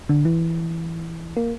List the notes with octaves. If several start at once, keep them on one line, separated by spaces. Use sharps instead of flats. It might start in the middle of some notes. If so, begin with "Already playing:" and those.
D3
E3
A#3